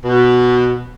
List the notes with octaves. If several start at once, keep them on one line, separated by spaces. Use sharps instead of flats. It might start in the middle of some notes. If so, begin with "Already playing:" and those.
B2